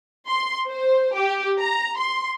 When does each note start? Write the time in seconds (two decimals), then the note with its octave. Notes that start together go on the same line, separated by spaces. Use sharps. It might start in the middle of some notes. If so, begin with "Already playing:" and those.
0.28 C6
0.69 C5
1.15 G4
1.60 A#5
1.97 C6